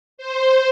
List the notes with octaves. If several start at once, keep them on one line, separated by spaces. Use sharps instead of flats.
C5